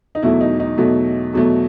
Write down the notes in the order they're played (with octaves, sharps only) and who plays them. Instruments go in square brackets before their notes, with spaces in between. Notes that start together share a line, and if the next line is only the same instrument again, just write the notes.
[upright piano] D#4
E2 B2 F#3 A3 E4
D#4
D#4
E2 B2 F#3 A3
E2 B2 F#3 A3